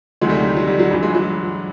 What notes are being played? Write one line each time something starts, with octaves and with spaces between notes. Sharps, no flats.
D2 C3 D#3 F#3 G#3
G3 A3
G3 A3
F#3
G3
F#3
G2 E3
F#3 G#3
F#3 G#3